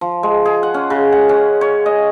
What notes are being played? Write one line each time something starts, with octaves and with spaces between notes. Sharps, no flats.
F3
G#3
G#4
F#5
C#4
C#3
F#5
C#4
C#5
D#5